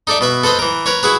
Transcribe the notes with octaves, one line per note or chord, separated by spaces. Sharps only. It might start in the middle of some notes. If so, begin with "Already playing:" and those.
D#4 A4 D5 E5
B2 B4 E5
A4 B4 C5 D#5
E3 A#4
A#4 B4 C#5
E4 F#4 G#4 B4